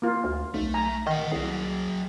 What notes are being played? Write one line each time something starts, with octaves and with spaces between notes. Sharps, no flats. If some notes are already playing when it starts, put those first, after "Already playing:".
A#3 F4
D2
B1 A3
G#5 A#5
D#3 D#5 F#5
C2 F#3 G#4